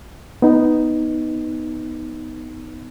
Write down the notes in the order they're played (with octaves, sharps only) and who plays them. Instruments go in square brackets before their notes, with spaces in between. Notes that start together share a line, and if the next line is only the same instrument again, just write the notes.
[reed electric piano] B3 D#4